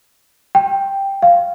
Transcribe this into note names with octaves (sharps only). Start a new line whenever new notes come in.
G5
F5